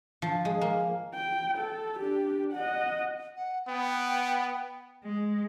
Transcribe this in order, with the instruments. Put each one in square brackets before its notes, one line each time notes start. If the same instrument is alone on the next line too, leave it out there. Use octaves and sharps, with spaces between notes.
[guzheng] F3
G#3
A#3
[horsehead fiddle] G5
A4
D4 G4
D#5 F#5
[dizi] F#5
[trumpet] B3 [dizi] G5
[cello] G#3